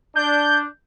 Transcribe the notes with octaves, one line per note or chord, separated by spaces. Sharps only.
D4 G6